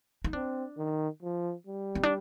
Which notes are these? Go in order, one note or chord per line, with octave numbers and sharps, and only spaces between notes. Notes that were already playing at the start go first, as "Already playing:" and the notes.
D#4
C4 D4
D#3
F3
G3
C4
D4